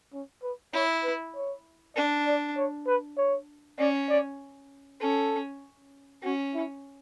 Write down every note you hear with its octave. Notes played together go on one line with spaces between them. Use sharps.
C#4
B4
E4 C#5
B4
C#5
D4 D5
D5
C#5
B4
C#5
C#4 D5
D5
C#4 A4
C#4 F#4
E4